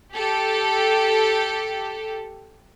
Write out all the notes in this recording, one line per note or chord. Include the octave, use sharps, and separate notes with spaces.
G4 A4